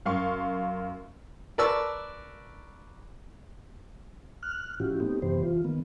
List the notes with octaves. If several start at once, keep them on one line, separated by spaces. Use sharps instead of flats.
F#2 F5 C6 C#6
A#4 B4 D5 A5 C#6 E6
F6 F#6
A2 F3 C#4 E4 F#4 G4
A3 B3 C4 D#4 G4
F#2 C3 E3 B3 G4 C5
E3 F4
D#3 A#3 B3